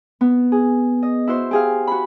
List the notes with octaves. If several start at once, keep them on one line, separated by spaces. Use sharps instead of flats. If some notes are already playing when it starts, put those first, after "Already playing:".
B3
G#4
D#5
E4 F#4 C5
G4 G#4 F5
F#4 B5